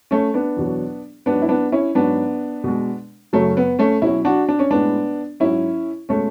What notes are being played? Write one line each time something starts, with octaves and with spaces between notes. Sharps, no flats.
A3 C#4
B3 D4
E2 B2 F#3
G#2 F#3 B3 D4
E4
B3 D4
C#4 E4
G#2 F#3 B3 D4
B2 G#3
F#2 C#3 F#3 A3
B3
A3 C#4
B2 F#3 C#4 E4
D4 F#4
D4
C#4
A2 G#3 B3 D4
G#2 F#3 C#4 E4
B2 G#3 A3 C#4